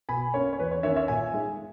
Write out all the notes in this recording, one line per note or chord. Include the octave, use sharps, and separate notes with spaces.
B2 G#5 B5
A#3 C#4 C#5
C#5
E2 B4
C#5
D#3 A#3 C#4 C#5 E5
C#5 E5
A#2 E5 G#5
G#3 D#4